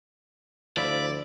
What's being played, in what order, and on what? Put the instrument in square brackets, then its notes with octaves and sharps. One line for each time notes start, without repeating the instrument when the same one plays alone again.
[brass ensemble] D2 [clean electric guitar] F3 E4 [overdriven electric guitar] D5